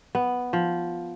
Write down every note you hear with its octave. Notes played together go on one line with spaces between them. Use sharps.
B3
F3